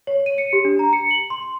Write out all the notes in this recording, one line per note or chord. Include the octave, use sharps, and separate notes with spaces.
C#5
D#7
C#7
G4
D4
A#5
C#7
F#7
C6